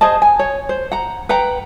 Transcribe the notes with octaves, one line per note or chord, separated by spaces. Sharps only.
G#4 C5 D#5 A5
G#5
C#5
C5
F#5 A#5
B4 F#5 G5 A#5